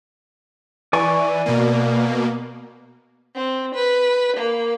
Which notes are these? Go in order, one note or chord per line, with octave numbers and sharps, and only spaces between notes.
E3 D5 G#5 C#6
B2 A#3
C4
B4
A#3